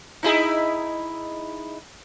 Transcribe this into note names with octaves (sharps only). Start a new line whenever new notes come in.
D#4 E4 G#4